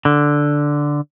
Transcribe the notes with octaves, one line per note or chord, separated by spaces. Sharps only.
D3